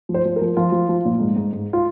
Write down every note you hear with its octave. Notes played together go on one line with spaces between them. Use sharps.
F3
C5
F3
A#4
F3
F3 F4
F3
F3
A#2
G#2
G#2
G#2
F4